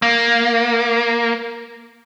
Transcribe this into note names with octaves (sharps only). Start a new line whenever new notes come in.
A#3